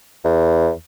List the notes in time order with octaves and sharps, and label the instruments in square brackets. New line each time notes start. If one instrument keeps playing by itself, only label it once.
[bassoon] E2